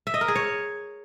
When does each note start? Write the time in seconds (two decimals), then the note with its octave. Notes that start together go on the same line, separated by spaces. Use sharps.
0.07 E5
0.14 D#5
0.21 A#4
0.28 G#4
0.35 C#5